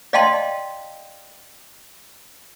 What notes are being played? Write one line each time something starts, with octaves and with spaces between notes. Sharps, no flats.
D5 D#5 F5 G5 A5 C6